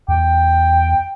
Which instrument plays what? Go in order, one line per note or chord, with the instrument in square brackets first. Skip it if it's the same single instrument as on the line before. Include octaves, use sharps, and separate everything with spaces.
[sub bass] E2 [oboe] G5